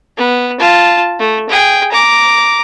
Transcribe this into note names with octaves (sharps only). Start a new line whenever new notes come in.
B3
F4 A5
A3
G#4 G5
A#5 D6